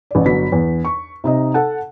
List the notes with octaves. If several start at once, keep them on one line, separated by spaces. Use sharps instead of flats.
A1 D5
G1 F#3 B6
E2
C#6
C3 D#4 D#5
A4 F#5 A5